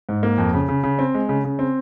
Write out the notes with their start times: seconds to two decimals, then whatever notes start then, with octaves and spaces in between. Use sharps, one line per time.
0.09 G#2
0.23 A#3
0.38 F2
0.54 C#3
0.69 C#3
0.83 C#3
0.99 C4
1.14 G#3
1.29 C#3
1.44 C#3
1.59 C4